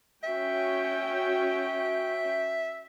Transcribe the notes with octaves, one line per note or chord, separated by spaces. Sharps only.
C#4 F#4 E5 G5